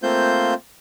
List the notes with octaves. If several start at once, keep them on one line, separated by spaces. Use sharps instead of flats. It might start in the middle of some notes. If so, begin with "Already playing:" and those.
A3 A#3 C4 F4 C5 G6